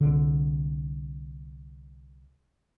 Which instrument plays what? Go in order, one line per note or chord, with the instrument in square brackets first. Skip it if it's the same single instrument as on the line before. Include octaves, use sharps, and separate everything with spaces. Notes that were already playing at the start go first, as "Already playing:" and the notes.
[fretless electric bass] C2 D3